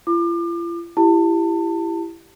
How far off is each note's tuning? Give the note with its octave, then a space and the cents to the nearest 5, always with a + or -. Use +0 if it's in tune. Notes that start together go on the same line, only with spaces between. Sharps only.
F4 -45 D6 +35
E4 +25 G4 +0 A5 +30